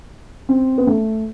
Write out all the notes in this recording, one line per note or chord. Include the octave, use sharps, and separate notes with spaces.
C4
B3
A3